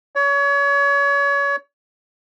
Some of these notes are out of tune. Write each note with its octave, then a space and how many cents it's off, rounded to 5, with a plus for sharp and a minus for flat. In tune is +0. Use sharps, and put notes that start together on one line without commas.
C#5 +30